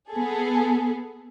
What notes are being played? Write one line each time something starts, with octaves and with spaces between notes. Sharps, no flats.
B3 G#4 A4